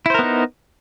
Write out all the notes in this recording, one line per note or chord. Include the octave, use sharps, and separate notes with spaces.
B3 D#4 E4 A#4 C5